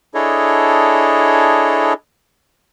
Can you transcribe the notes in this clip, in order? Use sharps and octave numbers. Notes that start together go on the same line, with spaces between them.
D4 E4 G#4 A4 C#5 D#5